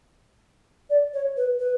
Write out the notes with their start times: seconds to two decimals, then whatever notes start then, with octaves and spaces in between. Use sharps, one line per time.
0.90 D5
1.13 C#5
1.37 B4
1.60 B4